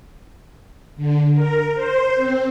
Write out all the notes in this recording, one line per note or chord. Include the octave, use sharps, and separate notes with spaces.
D3
A#4
C5
C4